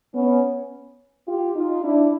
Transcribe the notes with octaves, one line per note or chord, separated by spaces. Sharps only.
B3 C#4
F4 G4
D#4 F4
D4 E4